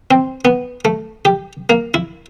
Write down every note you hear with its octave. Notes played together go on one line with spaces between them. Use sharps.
C4
B3
A3
G4
A#3
E4